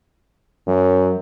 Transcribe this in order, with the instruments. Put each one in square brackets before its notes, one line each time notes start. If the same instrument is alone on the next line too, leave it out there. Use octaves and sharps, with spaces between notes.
[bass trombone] F#2 [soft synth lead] F#3